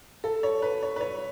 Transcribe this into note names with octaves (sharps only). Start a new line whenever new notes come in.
A4
C#5
B4
C#5
B4
C#5